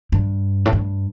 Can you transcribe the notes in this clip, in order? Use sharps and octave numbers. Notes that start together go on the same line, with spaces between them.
G2
A2
G2